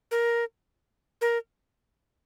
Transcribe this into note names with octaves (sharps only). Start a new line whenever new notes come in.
A#4
A#4